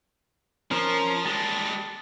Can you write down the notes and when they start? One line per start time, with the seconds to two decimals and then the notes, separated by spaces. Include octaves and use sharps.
0.71 F3 C#4 A#4 C5
1.26 G3 G#3 A5